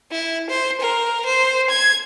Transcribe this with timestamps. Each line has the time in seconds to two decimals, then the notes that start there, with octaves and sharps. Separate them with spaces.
0.12 E4
0.50 C5
0.81 A#4
1.25 C5
1.70 G#6